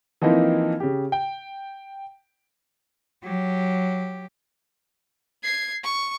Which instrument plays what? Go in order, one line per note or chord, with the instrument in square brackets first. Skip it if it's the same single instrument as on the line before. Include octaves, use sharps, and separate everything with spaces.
[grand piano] E3 F3 A#3 C4 D#4 E4
C#3 G4
G5
[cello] F#3 G4
[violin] G#6 C7
C#6